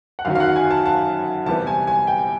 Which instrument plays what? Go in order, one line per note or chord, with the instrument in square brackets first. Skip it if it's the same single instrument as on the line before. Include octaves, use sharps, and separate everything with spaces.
[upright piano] F#5
F#2 D#3 F#3 F5
F5
F#5
G#5
A5
A5
C3 E3 G3 B3 A5
G#5
G#5
G5